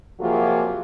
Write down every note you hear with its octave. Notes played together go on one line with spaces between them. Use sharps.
C3 F3 F#3 A#3 F4 G#4